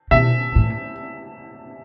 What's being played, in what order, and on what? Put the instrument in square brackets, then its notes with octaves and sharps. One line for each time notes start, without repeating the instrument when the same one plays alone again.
[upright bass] B2 [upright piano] E5
[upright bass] A2